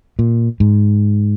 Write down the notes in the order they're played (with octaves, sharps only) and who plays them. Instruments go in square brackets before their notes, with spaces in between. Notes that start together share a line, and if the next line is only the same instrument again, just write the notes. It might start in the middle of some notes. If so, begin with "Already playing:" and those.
[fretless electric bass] A#2
G#2